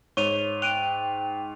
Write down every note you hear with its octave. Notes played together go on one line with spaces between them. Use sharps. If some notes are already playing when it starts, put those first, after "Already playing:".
G#2 C#5 C#6 D#7 F7
G5 F#6 D7 D#7 F7